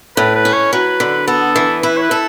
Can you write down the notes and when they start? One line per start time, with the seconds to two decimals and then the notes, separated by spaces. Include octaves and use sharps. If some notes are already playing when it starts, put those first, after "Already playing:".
0.17 A2 B4
0.35 B4
0.45 C#4
0.53 C#5
0.73 F#3 B4
1.00 D3
1.27 B3 A4
1.56 E3
1.83 E4 B4
1.97 C#5
2.01 B4
2.11 A4